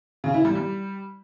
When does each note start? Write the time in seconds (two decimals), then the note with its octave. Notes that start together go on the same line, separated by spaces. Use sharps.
0.24 C#3
0.34 E4
0.45 G3
0.55 G3